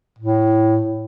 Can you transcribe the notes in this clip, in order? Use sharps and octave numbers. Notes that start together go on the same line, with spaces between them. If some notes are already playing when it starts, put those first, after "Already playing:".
A2